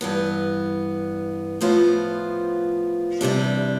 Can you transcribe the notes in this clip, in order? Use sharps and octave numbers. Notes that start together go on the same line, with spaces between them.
G2 E3 B3
A2 F3 B3 F4 C5
E2 C3 G3 D4